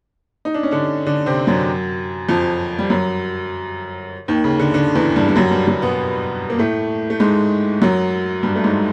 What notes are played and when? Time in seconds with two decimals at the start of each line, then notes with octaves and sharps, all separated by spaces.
0.45 D#4
0.54 D4
0.63 C#4
0.71 D3 D4
1.06 D3 D4
1.26 C3 C4
1.47 F#2 F#3
2.29 F2 F3
2.78 G3
2.90 F#2 F#3
4.28 D#2 D#3
4.44 C#3
4.59 D3
4.74 D3
4.95 E2 E3
5.16 G2 G3
5.28 G3
5.36 F#2 F#3
5.51 G2 G3
5.67 F#2 F#3
5.82 B2 B3
6.50 A#3
6.58 A2 A3
7.10 A3
7.20 G#2 G#3
7.82 F#2 F#3
8.43 G2 G3
8.56 A3
8.64 G#2 G#3